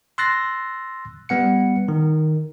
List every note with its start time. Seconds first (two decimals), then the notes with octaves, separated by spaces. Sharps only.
0.18 C6 E6 F#6 A6 A#6 C7
1.29 G3 B3 F#5 C#7
1.88 D#3